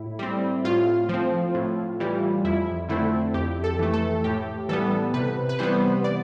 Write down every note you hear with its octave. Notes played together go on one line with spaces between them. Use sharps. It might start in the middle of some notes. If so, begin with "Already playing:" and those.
Already playing: A2 E4
G3 C4
A2 F4
F3 C4
A2
E3 G3
F2 E4
D3 A3 C4 E4
F2 G4
A4
E3 A3
A4
A2 G4
E3 G3 B3 A4
C3 B4
B4
E3 G3 B3 C5
D5